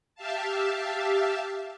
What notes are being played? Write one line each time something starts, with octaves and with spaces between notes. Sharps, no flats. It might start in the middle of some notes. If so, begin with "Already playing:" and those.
G4 E5 F5 A5